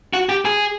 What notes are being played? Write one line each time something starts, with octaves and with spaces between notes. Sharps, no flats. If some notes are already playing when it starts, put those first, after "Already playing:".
F#4
G4
G#4